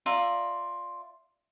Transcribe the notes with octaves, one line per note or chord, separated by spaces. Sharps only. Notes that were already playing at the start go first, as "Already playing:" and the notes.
F4 D5 E5 A#5